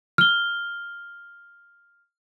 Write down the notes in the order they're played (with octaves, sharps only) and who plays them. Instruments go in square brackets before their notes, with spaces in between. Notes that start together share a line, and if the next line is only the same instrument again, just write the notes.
[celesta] F6 G7